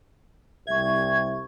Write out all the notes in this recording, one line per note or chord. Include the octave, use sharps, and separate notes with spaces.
C2 E5 C#6 G#6